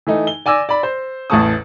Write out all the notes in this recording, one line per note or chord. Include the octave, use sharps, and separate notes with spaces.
E3 A3 D#4
G7
D5 G#5 D6 E6 A#6
D5 B5
C5
A1 E2 A2 A5 C#6 D#6